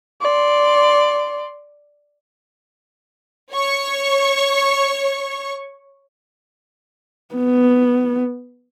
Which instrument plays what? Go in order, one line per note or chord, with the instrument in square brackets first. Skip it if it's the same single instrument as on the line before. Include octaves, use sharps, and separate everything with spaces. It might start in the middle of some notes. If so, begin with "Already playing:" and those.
[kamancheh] D5 C6
[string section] C#5 C#6
[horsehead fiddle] B3